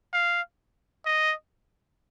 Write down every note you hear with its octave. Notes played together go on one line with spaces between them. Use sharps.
F5
D#5